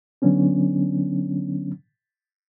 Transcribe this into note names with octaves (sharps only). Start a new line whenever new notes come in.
D3 F#3 B3 C#4 D4